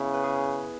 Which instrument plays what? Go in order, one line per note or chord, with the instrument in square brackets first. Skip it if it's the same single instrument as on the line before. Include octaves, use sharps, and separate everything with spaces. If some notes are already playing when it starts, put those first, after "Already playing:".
Already playing: [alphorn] C#3 [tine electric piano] B3 E4
[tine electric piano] B4
G#4